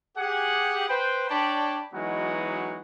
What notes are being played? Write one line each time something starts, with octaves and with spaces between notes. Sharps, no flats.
G4 G#4 F#5
B4 C5 G5
D4 C#5 D5 G5 A5 B5
E3 F#3 G#3 B3 D#4 F#4